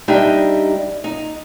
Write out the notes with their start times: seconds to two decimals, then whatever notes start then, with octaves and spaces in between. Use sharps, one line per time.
0.08 G3 D4 D#4 G4 D#5 E5
1.04 D#4